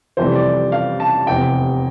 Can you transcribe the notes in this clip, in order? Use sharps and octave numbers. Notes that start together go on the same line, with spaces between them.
F1 F2 C3 E3 G3 C5
D5
F5
A5
F1 E2 C3 G5